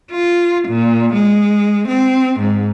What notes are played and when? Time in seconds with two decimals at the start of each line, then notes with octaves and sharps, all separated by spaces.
0.12 F4
0.68 A#2
1.14 G#3
1.88 C4
2.40 G#2